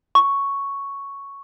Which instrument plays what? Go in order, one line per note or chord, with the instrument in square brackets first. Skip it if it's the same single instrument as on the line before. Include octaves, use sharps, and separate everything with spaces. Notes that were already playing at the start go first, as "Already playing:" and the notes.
[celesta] C#6